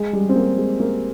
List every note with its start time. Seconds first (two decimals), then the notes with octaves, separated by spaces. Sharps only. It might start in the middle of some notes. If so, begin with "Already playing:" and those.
Already playing: G#3
0.13 G3
0.29 C4
0.36 A#3
0.57 G#3
0.80 A#3